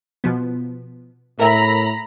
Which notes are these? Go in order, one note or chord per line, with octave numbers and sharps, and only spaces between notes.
B2 F3 B3
A2 A#4 E5 A#5 B5